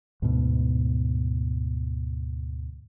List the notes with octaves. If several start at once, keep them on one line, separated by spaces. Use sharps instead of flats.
D2 G#2 B2